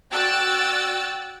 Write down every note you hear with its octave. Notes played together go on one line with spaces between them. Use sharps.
F#4 D5 G5 E6 F#6 A6